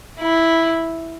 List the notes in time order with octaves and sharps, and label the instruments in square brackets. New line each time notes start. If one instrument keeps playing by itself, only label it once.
[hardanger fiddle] E4